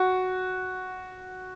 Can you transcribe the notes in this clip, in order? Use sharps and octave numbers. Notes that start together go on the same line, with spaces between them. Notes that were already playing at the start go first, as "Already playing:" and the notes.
Already playing: F#4